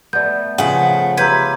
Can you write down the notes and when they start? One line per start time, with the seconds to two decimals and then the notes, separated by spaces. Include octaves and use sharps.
0.13 A3 B3 D5 G6
0.58 C#3 F3 A3 B3 F#5 G#5
1.17 F4 G4 B4 E5 A#5 G6 G#6